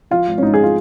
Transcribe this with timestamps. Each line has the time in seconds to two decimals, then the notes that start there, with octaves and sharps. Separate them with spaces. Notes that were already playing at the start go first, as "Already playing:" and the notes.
0.11 F3 F4
0.27 G#1
0.38 C#4
0.42 G#2 D#4
0.54 G#4
0.63 F4